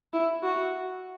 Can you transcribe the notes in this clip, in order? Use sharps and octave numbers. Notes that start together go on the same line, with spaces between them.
E4
F#4